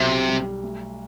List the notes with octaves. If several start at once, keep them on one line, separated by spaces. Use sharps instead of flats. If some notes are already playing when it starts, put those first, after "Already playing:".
Already playing: B1 C3 F#3
G3
A3